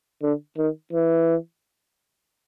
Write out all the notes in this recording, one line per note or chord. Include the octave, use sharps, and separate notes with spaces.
D3
D#3
E3